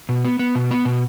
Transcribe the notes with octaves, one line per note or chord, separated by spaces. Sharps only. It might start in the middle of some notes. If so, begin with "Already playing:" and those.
B2
B3
B3
B2
B3
B2